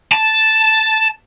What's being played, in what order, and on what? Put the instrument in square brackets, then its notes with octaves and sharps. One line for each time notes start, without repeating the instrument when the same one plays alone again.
[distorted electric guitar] A5